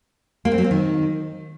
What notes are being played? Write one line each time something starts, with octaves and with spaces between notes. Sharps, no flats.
A#3
C4
F#3
C4
D#3